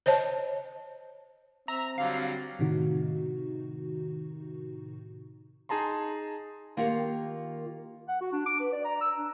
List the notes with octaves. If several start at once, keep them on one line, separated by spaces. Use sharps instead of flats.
C5 C#5 D#5 A5
C4 E5 A#5
D3 F#3 G3 F5
A2 C3 D#3 D#4 F#4
D#4 G#4 A5 A#5 C6
D#3 A#3 F4 G4 A#4 F#5
F#5
F#4
D4
D6
B4
D5
A#5
E6
D4